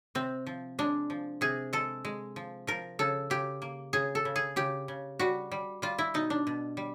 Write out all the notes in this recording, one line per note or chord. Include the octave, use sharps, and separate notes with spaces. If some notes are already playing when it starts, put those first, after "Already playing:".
C3 C4
F3
G#3 D4
F3
C3 G#4
G#3 A4
G#3
F3
F3 A#4
C#3 A4
C#3 G4
A#3
C#3 G#4
A4
C#3
G#4
C#3 G4
C#3
G3 F#4
G3
G3 F4
E4
B2 D#4
D4
B2
G3